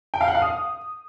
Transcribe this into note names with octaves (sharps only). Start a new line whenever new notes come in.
G5
F5
F#5
F5
D#6